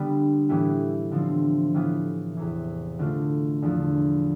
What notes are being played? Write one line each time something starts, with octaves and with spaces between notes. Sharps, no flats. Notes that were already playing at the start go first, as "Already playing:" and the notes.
Already playing: D3 G3 B3
A2 E3 B3 E4 G4
D3 F3 C4
A2 E3 B3 F4
E2 C3 E3
D3 A3 D4 F4
E2 D3 F3